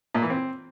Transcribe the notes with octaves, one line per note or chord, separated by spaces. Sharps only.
A#2
E3
C4